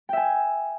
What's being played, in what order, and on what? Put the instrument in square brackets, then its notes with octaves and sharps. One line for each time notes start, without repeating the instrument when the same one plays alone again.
[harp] G5
E5
G#5